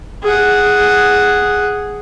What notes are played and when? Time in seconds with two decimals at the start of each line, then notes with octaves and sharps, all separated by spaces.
0.23 G#4 F#5